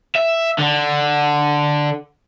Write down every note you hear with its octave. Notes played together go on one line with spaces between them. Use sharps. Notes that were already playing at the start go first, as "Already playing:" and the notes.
E5
D3